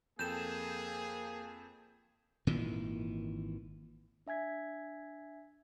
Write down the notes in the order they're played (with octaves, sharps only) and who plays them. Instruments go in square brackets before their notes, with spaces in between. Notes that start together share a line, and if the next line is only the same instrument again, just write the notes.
[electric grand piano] F2 A4 G5 [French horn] A#3 [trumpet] G#4 [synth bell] G6 E7
[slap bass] G#1 A#2 D#3 E3
[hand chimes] D4 E5 G#5 G#6 B6